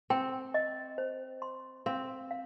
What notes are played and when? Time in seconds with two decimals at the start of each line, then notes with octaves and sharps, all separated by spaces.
0.10 C4 G5
0.54 D#5
0.98 C5
1.42 C6
1.86 C4 F5
2.31 F5